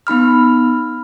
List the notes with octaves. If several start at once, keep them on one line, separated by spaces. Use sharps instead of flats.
B3 D#4 B5 F6